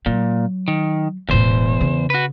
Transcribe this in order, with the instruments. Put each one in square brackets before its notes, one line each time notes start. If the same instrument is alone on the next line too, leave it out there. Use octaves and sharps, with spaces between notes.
[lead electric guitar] A#2 [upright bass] F#3
[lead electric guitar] D#3
[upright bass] E1 A2 [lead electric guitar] E2 C5
[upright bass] C#3
[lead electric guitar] F#4 B4